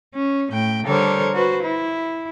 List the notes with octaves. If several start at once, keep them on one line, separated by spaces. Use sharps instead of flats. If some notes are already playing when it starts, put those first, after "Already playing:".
C#4
A2 G5
D3 G3 A4 A#4 C5 C#5
F#4 B4 C5
E4